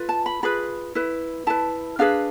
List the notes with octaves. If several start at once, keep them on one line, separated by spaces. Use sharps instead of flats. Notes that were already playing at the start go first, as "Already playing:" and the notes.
Already playing: F4 B4
A5
B5
F4 G#4 B4 B5
E4 B4
E4 B4 A5
D4 G#4 B4 F5